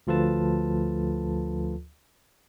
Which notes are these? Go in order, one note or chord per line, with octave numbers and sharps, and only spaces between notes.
D2 F3 F4 A4 B4 A5